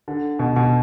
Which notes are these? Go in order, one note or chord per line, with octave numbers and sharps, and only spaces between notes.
D3
B2
B2